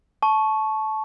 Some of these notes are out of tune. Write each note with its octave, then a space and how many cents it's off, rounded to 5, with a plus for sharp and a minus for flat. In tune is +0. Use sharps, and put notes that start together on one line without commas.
A5 -20 C#6 +0